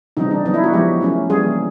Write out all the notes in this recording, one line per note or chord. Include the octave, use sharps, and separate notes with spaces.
C#3 E3 G3 C4 D#4
D4
F#3 B3 D#4
E4
F#4
F3 G#3 B3 G4
F#3 A3 C#4
E3 G3 A#3 C#4 G#4